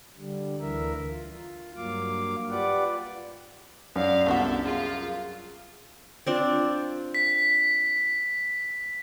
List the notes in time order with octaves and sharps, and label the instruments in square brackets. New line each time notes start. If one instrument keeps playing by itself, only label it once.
[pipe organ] D3 G3
D2 D3 E3 A#4 E5
F4
G2 F#3 A#3 F5 D6
F4 G4 B4 D5 F#5 D6
[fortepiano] F#2 [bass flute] D5 [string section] F5
[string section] C2 A4 E5 [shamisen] A3 D4 F#4 [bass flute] B3
[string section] F4 [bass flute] G#4
[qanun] C4 D4 F4
[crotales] B6